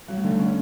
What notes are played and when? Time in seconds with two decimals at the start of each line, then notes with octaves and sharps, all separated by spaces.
0.08 F#3 G3
0.17 A3
0.24 D3 G3
0.39 C#4